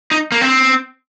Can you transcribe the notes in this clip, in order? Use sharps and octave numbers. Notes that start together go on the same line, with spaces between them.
D#4
A#3
C4